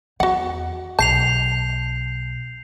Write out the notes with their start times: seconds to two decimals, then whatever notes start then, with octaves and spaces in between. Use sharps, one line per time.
0.20 E2 F#4 F#5
0.99 B1 A5 G6 C7 F7